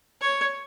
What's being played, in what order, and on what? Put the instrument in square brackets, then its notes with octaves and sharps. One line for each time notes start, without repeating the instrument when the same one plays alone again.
[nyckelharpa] C#5